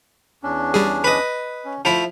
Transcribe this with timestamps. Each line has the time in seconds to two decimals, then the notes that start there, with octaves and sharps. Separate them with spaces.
0.43 E2 C#4 D4
0.74 G3 G#4
1.04 B4 D#5
1.65 C#4
1.85 F3 A3 E4